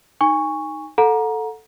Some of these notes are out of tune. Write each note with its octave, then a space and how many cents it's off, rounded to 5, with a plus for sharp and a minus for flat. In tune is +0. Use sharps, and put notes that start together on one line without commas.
D#4 +0 G#5 -20 C#6 +0
A4 +0 F#5 -30 A#5 +20